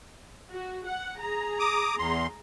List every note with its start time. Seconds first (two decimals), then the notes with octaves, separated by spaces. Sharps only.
0.51 F#4
0.86 F#5
1.19 G#4 A#5
1.59 D6 D#6
1.99 E2 C6